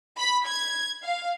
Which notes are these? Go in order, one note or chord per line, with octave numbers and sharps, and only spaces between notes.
B5
G#6
F5